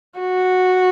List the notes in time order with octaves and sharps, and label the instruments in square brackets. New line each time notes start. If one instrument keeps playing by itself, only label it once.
[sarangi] F#4